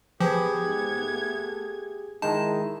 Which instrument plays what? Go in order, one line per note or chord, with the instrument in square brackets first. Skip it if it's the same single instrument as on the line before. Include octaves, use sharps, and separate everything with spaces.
[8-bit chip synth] F3 [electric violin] B3 G#6 [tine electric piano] G4 G#4 [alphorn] B4
[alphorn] G#2
A3
[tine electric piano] D#3 G#3 D#4 [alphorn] E4 [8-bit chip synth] A5